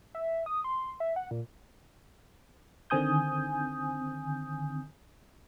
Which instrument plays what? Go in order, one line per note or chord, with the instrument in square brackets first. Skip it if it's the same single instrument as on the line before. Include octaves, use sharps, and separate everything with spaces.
[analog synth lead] E5
D#6
C6
E5
F#5
A#2
[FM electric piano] D3 D#3 C4 G#5 D#6 G6